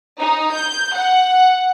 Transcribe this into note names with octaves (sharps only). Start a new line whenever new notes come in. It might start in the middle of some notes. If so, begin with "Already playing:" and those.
D#4
G6
F#5